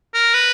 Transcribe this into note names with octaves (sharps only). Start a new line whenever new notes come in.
A#4
B4